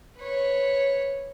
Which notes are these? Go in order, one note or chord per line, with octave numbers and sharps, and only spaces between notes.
B4 C#5